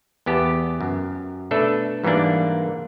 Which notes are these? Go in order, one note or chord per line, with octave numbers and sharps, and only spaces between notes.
E2 B3 G4 A5
F#2
B2 A3 D4 A4 B4 E5
G#2 E3 G3 A#3 D4